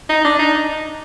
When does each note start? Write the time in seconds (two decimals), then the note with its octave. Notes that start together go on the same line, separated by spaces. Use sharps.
0.09 D#4
0.25 D4
0.39 D#4